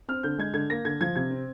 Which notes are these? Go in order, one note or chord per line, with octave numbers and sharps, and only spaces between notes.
C4 F6
D3 G6
G#3 G#6
D3 G#6
A#3 A#6
D3 G#6
F3 G#6
C3 G#6
C4